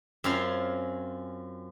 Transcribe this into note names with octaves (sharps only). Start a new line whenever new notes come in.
F#2 C4 C#4 F4 F5